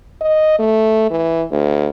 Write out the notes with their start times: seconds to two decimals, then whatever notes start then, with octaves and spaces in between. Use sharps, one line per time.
0.21 D#5
0.59 A3
1.10 E3
1.51 D2